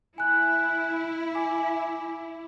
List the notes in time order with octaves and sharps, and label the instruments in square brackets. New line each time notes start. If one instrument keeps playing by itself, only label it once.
[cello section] E4 [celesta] G#5 F#6
[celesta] G#5 D6